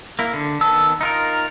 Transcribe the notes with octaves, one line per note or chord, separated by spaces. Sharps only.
A#3 E4
D3
D#3 B3 A5 E6
D#4 F4 A#4